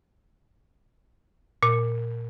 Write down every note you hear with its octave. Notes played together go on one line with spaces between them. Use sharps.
A#2